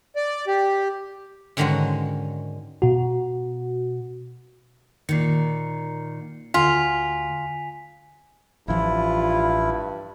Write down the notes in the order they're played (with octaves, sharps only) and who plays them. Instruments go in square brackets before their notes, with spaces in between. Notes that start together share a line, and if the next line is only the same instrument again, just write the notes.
[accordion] D5
G4
[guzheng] G#2 D3 D#3 G#3 C#4 F#4
[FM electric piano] B2 F#4
[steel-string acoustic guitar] A#2 D#3 [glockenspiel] C7 C#7
[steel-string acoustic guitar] D2 [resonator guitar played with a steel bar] F4 [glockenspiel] G#5 B6 F7
[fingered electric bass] A1 E3 F3 [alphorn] G2 [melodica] E4 [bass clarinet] F4